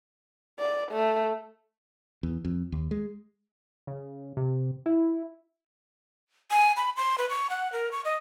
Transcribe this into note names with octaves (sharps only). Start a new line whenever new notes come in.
D5
A3
E2
F2
D#2
G#3
C#3
C3
E4
G#5
B5
C6
B4
C#6
F#5
A#4
C#6
D#5